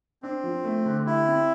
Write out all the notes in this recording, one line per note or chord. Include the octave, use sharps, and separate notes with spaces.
C4 D4
F3
A3
D3
E4 G4
C4